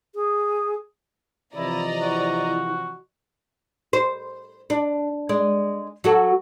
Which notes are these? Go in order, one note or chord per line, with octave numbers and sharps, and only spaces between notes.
G#4
C3 E3 F3 E4 D5 D#5 A#5
E4 F#4
C5
D4
G#3 D5
F#3 F#4 A4